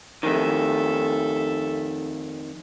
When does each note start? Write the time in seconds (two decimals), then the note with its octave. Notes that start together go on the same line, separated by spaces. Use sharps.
0.23 F2 D#3 A4 E5